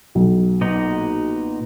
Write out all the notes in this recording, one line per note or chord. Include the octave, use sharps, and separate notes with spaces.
B1
A#2 B3 D#4